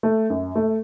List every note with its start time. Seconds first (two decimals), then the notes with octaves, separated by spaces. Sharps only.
0.03 A3
0.30 F#2
0.56 A3